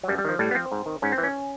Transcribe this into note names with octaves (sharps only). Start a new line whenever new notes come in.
F#3
F#2 G3
G3
D#3 F3
A2 G3
B3
F3 C4
G#2
D#3
G#2 C#4
C4
E3
C#4